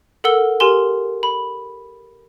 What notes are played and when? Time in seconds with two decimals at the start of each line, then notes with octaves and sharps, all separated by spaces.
0.24 A4 A#4 F#5 E6 G7
0.60 G4 A#4 G#5 C6 G7
1.23 B5